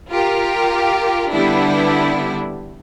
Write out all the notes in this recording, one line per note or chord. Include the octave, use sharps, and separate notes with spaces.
F4 G4 A#4
D3 G3 B3 D4 E4